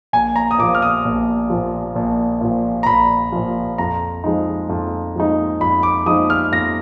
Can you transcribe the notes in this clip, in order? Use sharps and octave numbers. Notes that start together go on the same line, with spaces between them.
A#1 G#5
A#5
D#6
A#2 F3 D6
F6
D#6
A#1
A#2 F3
A#1
A#2 F3
A#5
A#1 B5
A#2 F3
F2 A#5
F3 G#3 D#4
F2
F3 G#3 D#4
F2 B5
D6
F3 G#3 D#4 D#6
F6
F2 A#6